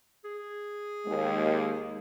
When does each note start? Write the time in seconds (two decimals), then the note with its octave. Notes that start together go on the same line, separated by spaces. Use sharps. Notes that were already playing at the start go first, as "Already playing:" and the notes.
0.25 G#4
1.06 D#2 G#3